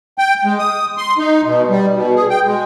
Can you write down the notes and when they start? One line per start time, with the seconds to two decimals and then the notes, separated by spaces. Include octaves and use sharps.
0.18 G5
0.44 G#3
0.59 D#6
0.98 C6
1.18 D#4
1.44 B2
1.69 G3
1.95 B2
2.15 G#4
2.30 G5
2.46 G#3